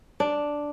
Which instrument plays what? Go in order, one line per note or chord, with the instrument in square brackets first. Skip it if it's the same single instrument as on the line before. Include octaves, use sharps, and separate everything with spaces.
[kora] D4